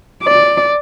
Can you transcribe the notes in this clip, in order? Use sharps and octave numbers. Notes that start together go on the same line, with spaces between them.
D5